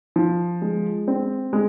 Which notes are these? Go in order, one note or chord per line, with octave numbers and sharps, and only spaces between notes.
F3
G#3
C4
G#3